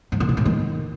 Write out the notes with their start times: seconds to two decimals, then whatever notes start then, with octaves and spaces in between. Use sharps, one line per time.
0.12 G#2
0.20 A#2
0.29 B2
0.37 A2
0.45 D#3